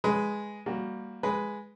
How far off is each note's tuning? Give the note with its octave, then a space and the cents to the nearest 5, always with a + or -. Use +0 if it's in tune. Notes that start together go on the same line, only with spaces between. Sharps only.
G#3 +0 B4 +0 D#6 +20
G3 +15 A#3 +0 F#4 +0
G#3 +0 B4 +0